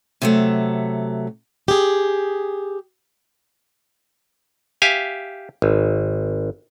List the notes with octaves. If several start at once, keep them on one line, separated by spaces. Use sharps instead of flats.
C3 F#3 A3
G4 G#4
G4 E5 F5 G#5
G#1